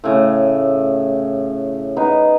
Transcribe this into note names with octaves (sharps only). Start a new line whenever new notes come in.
A2 C#3
B3 D#4 G#4